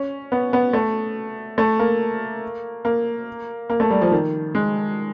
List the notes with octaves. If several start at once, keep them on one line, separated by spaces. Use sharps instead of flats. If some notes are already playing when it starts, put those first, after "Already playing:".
Already playing: C#4
B3
B3
A3
A3
A#3
A#3
A#3
A3
G3
F3
D#3
G#3